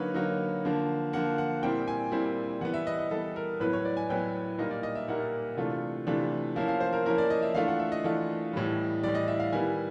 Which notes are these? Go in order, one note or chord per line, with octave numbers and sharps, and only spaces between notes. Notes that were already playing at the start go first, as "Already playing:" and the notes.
Already playing: D3 F#3 A#3 D#4 B4 C#5
D3 F#3 A#3 D#4
D3 F3 A#3
D3 F3 A#3 F#5
F#5
A#2 G3 C4 E4 G5
G#5
A#2 G3 C4 E4
E3 G3 B3 F#5
E5
D#5
D#5
E3 G3 B3 A4
A#4
A2 F#3 B3 E4 B4
C#5
D5
G#5
A2 F#3 B3 E4 G5
A#2 G3 A#3 D#4 D#5
D5
D#5
E5
A#2 G3 A#3 D#4 F#5
C3 E3 A3 D4 F4
C3 E3 A3 D4 F4
F3 A#3 C#4 E4 F5
F5
C5
A#4
F3 A#3 C#4 E4 A#4
D5
D#5
E5
E3 A3 D4 F4 F5
F#5
E5
D#5
E3 A3 D4 F4
A2 E3 G3
A2 E3 G3 D5
D#5
E5
F5
D#3 G3 B3 E4 G#5